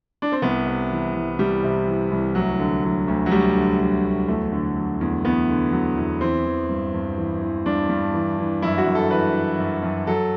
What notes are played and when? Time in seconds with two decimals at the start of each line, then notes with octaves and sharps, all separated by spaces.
0.22 D4
0.32 C4
0.42 C2 B3
0.66 C3
0.91 E3
1.14 C2
1.39 C2 G3
1.63 C3
1.88 E3
2.11 C2
2.35 D2 F#3
2.59 D3
2.84 F#3
3.08 D2
3.26 F#3
3.31 D2 G3
3.55 D3
3.80 F#3
4.04 D2
4.28 E2 A3
4.52 D3
4.76 F#3
5.01 E2
5.24 E2 B3
5.49 D3
5.72 F#3
5.98 E2
6.21 E3 C4
6.45 E3
6.69 G2
6.94 G2
7.18 E3
7.42 E3
7.66 G2 D4
7.89 G2
8.14 E3
8.39 E3
8.62 F#2 E4
8.78 F#4
8.87 F#2
8.95 A4
9.11 E3 B4
9.34 E3
9.59 F#2
9.83 F#2
10.07 F#3 A4